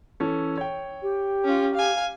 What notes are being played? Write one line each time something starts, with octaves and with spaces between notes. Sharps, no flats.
E3 C#4 A4
C#5 G5
G4
C#4 F4
F5 G#5